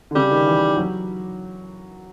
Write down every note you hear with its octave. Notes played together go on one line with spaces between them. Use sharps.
D3
C#3 G3
D#3
E3
F#3